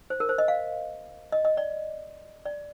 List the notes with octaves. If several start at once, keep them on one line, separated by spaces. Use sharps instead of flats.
C5
A#4
C5
D#5
F5
D#5
D#5
D5
D5